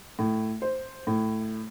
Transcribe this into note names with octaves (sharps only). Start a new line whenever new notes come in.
A2
C5
A2